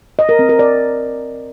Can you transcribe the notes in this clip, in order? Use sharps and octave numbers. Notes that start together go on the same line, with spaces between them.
D#5
A#4
C4
A#4
D5